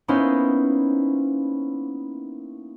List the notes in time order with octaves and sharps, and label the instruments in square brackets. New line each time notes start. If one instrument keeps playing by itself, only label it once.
[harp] A#3 B3 C#4 D#4 E4 C5